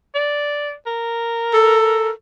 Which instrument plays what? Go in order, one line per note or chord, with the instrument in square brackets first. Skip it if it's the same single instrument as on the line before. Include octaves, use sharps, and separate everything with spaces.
[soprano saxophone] D5
A#4
[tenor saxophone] A4